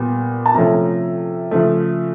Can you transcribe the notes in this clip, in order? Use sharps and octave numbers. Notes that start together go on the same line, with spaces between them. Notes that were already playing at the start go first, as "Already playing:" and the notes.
Already playing: A#2 G3 B3
A5
C3 F3 A3 C#4 A#5
C#3 F3 A3